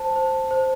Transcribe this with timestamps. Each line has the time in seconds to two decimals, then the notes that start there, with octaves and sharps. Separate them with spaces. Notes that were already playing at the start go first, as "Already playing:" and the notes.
Already playing: C5 A5
0.16 C5
0.51 C5